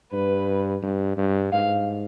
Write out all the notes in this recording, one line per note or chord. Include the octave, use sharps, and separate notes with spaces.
G2 B4
G2
G2
G#2 F5